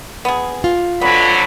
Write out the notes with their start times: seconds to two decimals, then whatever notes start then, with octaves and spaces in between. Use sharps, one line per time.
0.25 B3 G#4
0.64 F4
1.01 F2 D3 F#3 B3 B5